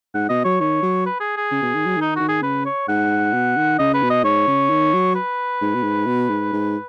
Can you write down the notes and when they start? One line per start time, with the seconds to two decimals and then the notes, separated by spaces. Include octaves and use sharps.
0.14 G#2 F#5
0.29 B2 D#5
0.44 F#3 C#5
0.61 D#3 C#5
0.83 F#3
1.06 B4
1.20 G#4
1.37 G#4
1.51 C#3
1.62 B2
1.75 D#3
1.86 F#3
1.97 D#3 D#4
2.16 D#3 F#4
2.28 G#4
2.42 C#3 B4
2.65 C#5
2.88 G#2 F#5
3.34 B2
3.57 D#3
3.79 C#3 D#5
3.94 B4
4.02 B2
4.10 D#5
4.24 G#2 C#5
4.47 C#3
4.70 D#3
4.93 F#3
5.15 B4
5.61 G#2
5.75 B2
5.83 G#2
6.07 B2
6.30 G#2
6.53 G#2